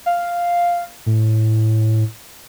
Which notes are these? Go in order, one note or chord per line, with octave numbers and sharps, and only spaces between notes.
F5
A2